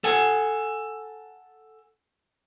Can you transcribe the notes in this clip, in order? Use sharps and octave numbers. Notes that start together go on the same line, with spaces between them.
A4 F#5 G#5